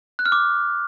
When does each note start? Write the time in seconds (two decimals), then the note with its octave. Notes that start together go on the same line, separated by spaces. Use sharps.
0.19 F#6
0.26 F6
0.32 D6